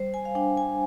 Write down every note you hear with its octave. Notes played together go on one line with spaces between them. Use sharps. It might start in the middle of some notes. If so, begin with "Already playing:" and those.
Already playing: G3 C5
G#5
F5
D4 G5
G#5